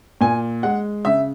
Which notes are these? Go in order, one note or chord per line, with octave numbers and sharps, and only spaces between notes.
A#2 G#5
G#3 F#5
C#3 E5